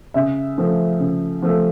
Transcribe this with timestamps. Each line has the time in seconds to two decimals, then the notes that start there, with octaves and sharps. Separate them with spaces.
0.14 C#3 E5
0.58 F3 A3
1.00 C#3
1.42 F3 A3